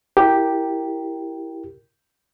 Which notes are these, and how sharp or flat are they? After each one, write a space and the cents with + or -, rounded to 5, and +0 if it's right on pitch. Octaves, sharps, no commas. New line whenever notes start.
E4 +0 G4 +0 A#4 +0